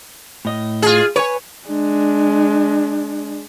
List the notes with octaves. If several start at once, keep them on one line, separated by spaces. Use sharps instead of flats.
A2 D#5
F4 G#4
B4 C#5 G#5
G#3 D4